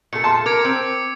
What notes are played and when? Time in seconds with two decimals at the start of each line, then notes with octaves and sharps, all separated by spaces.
0.13 A#2 A4 C#7
0.24 A5 C6
0.46 A#4 D6 G#6
0.65 C4